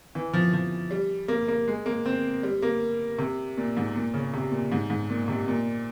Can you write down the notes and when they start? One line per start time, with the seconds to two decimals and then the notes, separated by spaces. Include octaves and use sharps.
0.15 E3
0.33 F3
0.53 F3
0.91 G3
1.28 A#3
1.48 A#3
1.68 G#3
1.86 A#3
2.06 C4
2.43 G3
2.62 A#3
3.19 C3
3.57 A#2
3.77 G#2
3.96 A#2
4.14 C#3
4.34 C3
4.52 A#2
4.72 G#2
4.90 G#2
5.10 A#2
5.28 C3
5.48 A#2